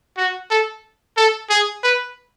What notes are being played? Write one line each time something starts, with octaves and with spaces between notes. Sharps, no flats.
F#4
A4
A4
G#4
B4